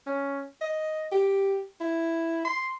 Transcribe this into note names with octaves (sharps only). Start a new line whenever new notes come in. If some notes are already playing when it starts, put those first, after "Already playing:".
C#4
D#5
G4
E4
C6